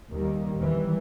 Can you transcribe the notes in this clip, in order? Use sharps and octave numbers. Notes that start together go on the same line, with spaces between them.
D#2 D#3 G3 A#3
E2 E3 G3